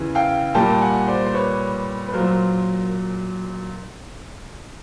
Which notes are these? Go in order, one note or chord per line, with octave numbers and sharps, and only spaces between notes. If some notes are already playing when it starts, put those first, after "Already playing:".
Already playing: E2 C#3 E3
F5 G5
A#2 G3 A#3 G5 A5
F#5 G#5
C5 D5
C5
B4 C#5
B4
A#2 F#3 A#3 A#4 C5